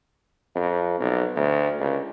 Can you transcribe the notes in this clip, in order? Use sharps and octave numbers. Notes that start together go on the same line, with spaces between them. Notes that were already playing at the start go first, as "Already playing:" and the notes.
F2
B1
D2
C#2